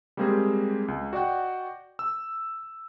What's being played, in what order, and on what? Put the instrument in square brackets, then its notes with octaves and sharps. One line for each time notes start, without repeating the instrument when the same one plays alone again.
[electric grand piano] G3 G#3 A#3 C4 G4 G#4
C#2
F#4 D5 D#5 F#5 G5
E6